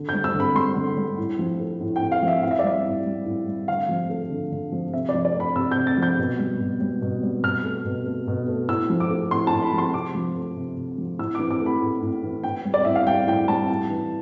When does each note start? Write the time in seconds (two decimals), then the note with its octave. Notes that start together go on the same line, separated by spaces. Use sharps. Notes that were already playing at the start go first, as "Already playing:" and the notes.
Already playing: D3
0.09 G6
0.14 G3
0.24 E6
0.34 D3
0.40 B5
0.55 G3 C6
0.76 D3
0.97 G3
1.18 A2
1.39 F3
1.60 A3
1.81 A2
1.96 G5
2.01 A2
2.12 F5
2.22 F3
2.28 E5
2.43 A2 F5
2.51 E5
2.59 D5
2.64 G3 E5
2.85 A2
3.06 G3
3.26 A2
3.47 G3
3.68 D3 F5
3.89 F3
4.09 A3
4.30 D3
4.52 D3
4.72 F3
4.93 C3 E5
5.09 D5
5.14 F3
5.25 D5
5.35 A3
5.40 B5
5.55 C3 E6
5.71 G6
5.77 C3
5.87 A6
5.98 F3 G6
6.18 B2
6.39 G3
6.60 B2
6.81 G3
7.02 B2
7.23 G3
7.43 B2 F6
7.64 A3
7.85 B2
8.06 A3
8.27 B2
8.48 A3
8.69 A2 E6
8.90 F3
9.00 D6
9.10 A3
9.31 A2 C6
9.47 A5
9.52 A2
9.62 B5
9.73 F3
9.78 C6
9.94 C3 D6
10.15 F3
10.36 A3
10.57 C3
10.77 C3
10.98 F3
11.19 A2 E6
11.35 D6
11.39 E3
11.51 D6
11.60 A3
11.66 B5
11.82 A2
12.02 A2
12.24 E3
12.44 A2 G5
12.65 G3
12.74 D5
12.85 A2 E5
12.95 F5
13.07 G3 G5
13.27 A2 G5
13.48 G3 A5
13.69 A2
13.90 E3